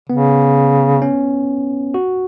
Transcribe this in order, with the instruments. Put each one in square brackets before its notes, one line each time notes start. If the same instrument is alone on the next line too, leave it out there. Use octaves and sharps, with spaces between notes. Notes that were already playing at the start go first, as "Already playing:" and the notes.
[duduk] C#3 [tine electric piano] B3
[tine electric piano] C#4
F#4